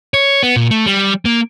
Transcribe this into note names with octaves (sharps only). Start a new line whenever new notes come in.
C#5
B3
A#2
A3
G3
A#3